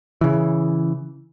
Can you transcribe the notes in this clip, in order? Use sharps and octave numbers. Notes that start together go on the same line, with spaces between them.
C#3 E3